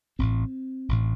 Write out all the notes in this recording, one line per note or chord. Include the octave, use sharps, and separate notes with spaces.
A1 A2 C4
A1 A2